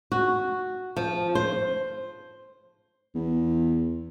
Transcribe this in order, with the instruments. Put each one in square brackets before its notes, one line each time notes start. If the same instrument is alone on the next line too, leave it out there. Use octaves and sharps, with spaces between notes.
[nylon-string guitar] F#4
F3
C5
[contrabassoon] E2